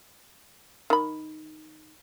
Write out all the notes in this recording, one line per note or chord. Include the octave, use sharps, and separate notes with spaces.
D#3 B5